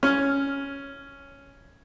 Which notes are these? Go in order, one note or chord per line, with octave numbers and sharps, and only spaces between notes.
C#4 F6